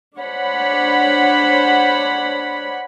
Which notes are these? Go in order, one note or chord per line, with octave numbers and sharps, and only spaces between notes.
D4 C5 C#5 F#5 B5